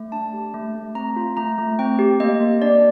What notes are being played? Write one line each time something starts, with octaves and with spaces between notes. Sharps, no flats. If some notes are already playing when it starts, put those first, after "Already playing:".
Already playing: A3
D4 A5
G4
A3
A3
C4 A#5
F4
A3 A#5
A3
C4 G5
G4
A#3 D#5
A#3
D4 D5